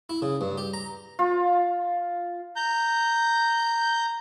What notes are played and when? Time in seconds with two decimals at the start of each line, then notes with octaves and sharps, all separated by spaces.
0.09 E4
0.22 C#3
0.41 G2
0.58 G4
0.74 A#5
1.19 F4
2.56 A#5 G6